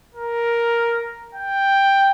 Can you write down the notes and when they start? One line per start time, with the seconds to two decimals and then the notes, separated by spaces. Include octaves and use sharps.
0.15 A#4
1.35 G5